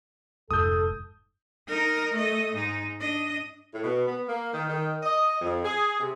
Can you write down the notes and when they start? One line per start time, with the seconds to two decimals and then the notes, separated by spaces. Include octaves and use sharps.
0.51 F1 G#2 A4 D#6 G6
1.67 D#4 A#4
2.12 A3 D#5
2.54 G#2 D#4
2.99 D4 D#5
3.72 A2
3.83 B2
4.06 B3
4.27 A#3
4.53 D#3
4.68 D#3
5.03 D#5
5.41 F2
5.64 G#4
6.00 C3